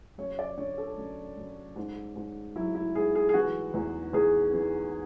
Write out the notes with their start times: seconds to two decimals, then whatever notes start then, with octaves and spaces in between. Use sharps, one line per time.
0.18 F#2 C#5
0.39 D5
0.57 D3 C#5
0.78 A4
0.97 F#2
1.37 F#2
1.76 G#2
2.16 G#2
2.56 F#3 E4
2.75 E4
2.95 G#2 G#4
3.15 G#4
3.29 G#4
3.34 E3 F#4
3.74 E2
4.13 E2 G#4
4.53 E3